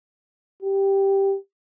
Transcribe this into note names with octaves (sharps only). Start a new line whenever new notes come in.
G4